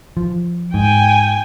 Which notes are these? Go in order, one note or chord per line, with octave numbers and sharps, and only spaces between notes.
F3
G#2 G5 G#5